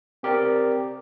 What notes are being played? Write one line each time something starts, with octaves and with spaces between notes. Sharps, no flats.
C4 G4 A#4 D5